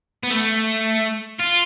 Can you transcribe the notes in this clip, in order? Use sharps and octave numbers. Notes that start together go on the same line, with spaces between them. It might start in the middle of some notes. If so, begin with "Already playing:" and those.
B3
A3
F4